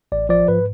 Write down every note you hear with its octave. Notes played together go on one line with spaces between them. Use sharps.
A1 D5
F3 D5
G#2 B4